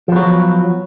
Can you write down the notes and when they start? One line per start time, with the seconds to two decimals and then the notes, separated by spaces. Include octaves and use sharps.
0.08 F3
0.12 B3
0.16 F#3